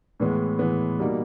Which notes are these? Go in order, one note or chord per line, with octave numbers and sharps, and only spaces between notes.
A2 E3 G#3 B3
A2 E3 G#3 B3
B2 G3 A#3 D#4